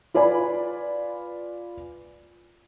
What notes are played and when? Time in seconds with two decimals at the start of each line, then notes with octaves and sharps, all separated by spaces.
0.14 F4 B4 D5 G#5 B5